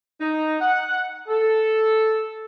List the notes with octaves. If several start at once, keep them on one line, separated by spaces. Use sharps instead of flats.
D#4
F#5
A4